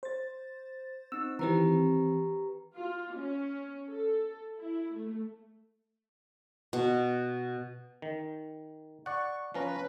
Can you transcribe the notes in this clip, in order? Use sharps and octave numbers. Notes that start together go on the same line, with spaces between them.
C5 A6
C4 D#4 E6
D#3 E3 C4 G4 B4 A#5
F4
C#4
A4
E4
A3
B2
D#3
D5 F#5 C#6
F3 C#4 B4 A#5